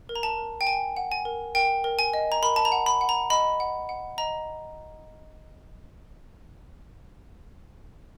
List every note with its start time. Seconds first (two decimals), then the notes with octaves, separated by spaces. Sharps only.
0.09 A#4
0.16 A#5
0.23 A5
0.38 A#4
0.61 G5
0.67 A#4 G#5
0.97 F#5
1.12 G#5
1.25 A#4
1.55 A#4 G5
1.84 A#4
1.99 G#5
2.13 D#5
2.32 A#5
2.42 A#4 B5
2.56 A5
2.65 A#5
2.72 F#5
2.86 B5
3.01 F#5
3.09 A#5
3.30 D#5 B5
3.60 F#5
3.89 F#5
4.18 D#5 A#5